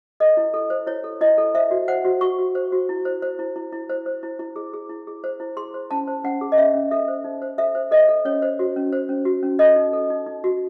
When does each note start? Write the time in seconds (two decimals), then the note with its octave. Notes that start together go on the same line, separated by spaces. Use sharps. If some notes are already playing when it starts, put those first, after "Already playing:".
0.20 A4 D#5
0.37 E4
0.54 A4
0.70 C5
0.87 E4 C#5
1.04 A4
1.21 E4 D#5
1.38 A4
1.55 C5 E5
1.71 F#4
1.88 C5 F#5
2.04 F#4
2.21 F#4 C#6
2.39 F#4
2.55 C5
2.72 F#4
2.89 E4
3.05 C5
3.22 C5
3.39 E4
3.56 E4
3.72 E4
3.89 C5
4.06 C5
4.23 E4
4.39 E4
4.56 G#4
4.74 G#4
4.89 E4
5.07 G#4
5.24 C5
5.40 E4
5.57 G#4 C6
5.74 C5
5.91 C#4 A5
6.08 C5
6.24 C#4 F#5
6.41 G#4
6.52 D#5
6.58 C#4 E5
6.74 C#4
6.91 A4 E5
7.08 C5
7.24 D#4
7.42 C5
7.58 A4 E5
7.75 C5
7.91 A4 D#5
8.08 A4
8.25 C#4 C#5
8.42 C5
8.59 F#4
8.76 C#4
8.93 C5
9.09 C#4
9.25 F#4
9.43 C#4
9.59 A4 D#5
9.76 D#4
9.93 A4
10.10 D#4
10.27 D#4
10.44 F#4